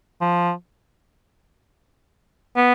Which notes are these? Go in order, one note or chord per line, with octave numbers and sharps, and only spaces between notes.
F3
B3